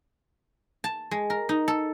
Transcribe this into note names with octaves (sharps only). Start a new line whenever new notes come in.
A5
G#3
A#4
D#4
A4